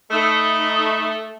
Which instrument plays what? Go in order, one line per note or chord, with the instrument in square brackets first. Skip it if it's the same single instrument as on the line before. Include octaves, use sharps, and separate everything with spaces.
[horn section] A3 [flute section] D#4 B5 D#6